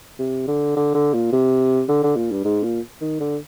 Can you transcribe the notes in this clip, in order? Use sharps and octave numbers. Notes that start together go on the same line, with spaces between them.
C3
D3
D3
D3
A#2
C3
D3
D3
A#2
G2
G#2
A#2
D#3
D3